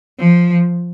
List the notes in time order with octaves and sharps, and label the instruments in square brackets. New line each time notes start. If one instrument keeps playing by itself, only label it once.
[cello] F3